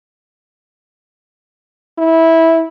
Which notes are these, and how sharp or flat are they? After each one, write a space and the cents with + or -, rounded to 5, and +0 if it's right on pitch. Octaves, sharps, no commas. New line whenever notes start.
E4 -15